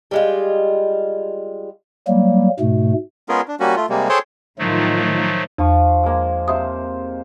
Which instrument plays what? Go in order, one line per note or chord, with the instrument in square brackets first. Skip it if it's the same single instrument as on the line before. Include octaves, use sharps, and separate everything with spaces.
[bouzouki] G3 G#3 F4
[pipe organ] F#3 G3 A#3
G#2 B2 A3
[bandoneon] G#3 B3 C#4 F4 G#4 A#4
D4
G3 A#3 C#4 F#4
A3 F4
C3 G3 G#3 A#3
G#4 A4 C5 C#5 G5 A5
[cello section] A2 D#3 F4 [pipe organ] F3 F#3 A3
[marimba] E2 [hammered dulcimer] F3 F4 C#6
[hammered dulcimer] G#3 A#3
[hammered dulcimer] C3 D#4 C5 [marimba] E5 D#6